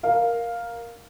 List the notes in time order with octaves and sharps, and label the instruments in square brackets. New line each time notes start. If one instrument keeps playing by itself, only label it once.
[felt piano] A#4 F5